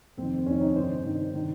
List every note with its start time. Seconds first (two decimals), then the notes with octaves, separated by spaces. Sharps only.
0.17 F2 C4
0.22 D#3
0.38 C4
0.46 F2 D#3 C#4
0.61 D#4
0.76 G2 D#3 C5
1.05 G2 D#3
1.34 D#3